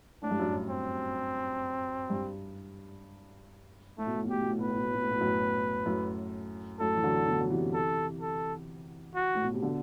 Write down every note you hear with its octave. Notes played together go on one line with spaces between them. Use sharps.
A2 D4
G2
F#2 A2
C4
G2
A2 A3
B2
A2
B2
A2 G4
B2
A2
B2 B4
A2
B2
A2
B2
A2
B2
F#2 A2
F#2 A2
F#2 A2 A4
E3
D3 F#3
B2 D3
F#3
C3 E3
A4
A4
F#4
A2
B2
C3
B2 D3